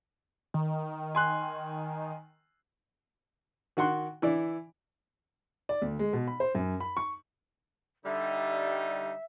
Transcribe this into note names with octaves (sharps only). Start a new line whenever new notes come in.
D#3
G#5 C6 F#6
D#3 F#4 F#5 C6
E3 E4 D5
D5
D2
G#3
B2
B5
C5
F#2
B5
C#6
D3 G3 D#4 E5